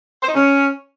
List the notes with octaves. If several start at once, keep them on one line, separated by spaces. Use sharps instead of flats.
C5
D#4
C#4